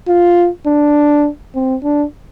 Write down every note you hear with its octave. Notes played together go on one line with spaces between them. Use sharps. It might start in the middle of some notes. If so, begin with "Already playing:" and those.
F4
D4
C4
D4